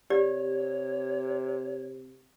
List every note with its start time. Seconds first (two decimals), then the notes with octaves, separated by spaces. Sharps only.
0.10 C3 G4 C#5 D5